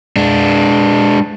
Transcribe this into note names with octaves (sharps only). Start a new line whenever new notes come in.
G#3 D4